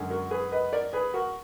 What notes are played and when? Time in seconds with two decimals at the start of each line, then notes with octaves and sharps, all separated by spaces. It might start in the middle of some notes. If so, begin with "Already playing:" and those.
Already playing: F#2 D3 G#3
0.10 F#4 A#4
0.31 G#4 B4
0.52 B4 D#5
0.72 A#4 D5
0.93 G#4 B4
1.14 F#4 A#4